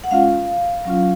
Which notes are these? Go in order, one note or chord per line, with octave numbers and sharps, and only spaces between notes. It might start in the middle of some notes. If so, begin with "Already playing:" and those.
F#5
G#3 C#4 F4 F5
F#3 C#4 F4